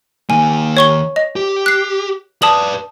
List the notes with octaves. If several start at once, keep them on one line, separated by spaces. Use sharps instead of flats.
D#3 A#3 G#5
C#5 C#6 G7
D#5
G4
F#6 C7
B4 D5 A5 D#6 F#7